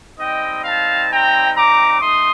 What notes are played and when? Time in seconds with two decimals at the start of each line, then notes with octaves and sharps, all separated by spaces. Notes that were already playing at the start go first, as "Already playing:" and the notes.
0.18 G3 C4 D#4 D#5 G5
0.64 F5 A5
1.09 G5 A#5
1.55 A#5 D6
2.00 A3 D#4 C6 D#6